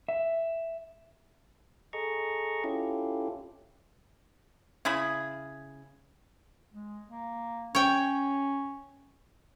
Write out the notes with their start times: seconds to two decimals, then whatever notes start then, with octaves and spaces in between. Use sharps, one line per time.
0.08 E5
1.93 G#4 A4 D#5 A#5 C#6
2.64 C#4 E4 F4 G4 A4
4.85 C#3 E4 G#4 B5
6.72 G#3
7.08 A#3
7.75 C#4 C#5 G5